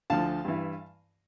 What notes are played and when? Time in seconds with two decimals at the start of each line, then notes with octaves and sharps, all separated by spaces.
0.10 D2 D3 F3 F5 A5
0.45 G2 E3